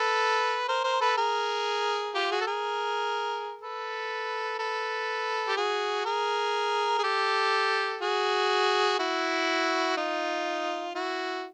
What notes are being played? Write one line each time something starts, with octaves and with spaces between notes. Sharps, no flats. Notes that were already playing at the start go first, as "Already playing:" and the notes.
Already playing: A4 B4
A#4 C5
A#4 C5
A4 B4
G#4 A#4
F4 G4
F#4 G#4
A4
G#4 A#4
A4 B4
A4 B4
G4
F#4 G#4
G#4 A#4
G#4
G4 A4
F#4 G#4
E4 F#4
D#4 F4
E4 F#4